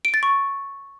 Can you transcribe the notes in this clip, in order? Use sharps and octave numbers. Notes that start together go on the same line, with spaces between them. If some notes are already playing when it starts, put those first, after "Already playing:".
D7
A6
C#6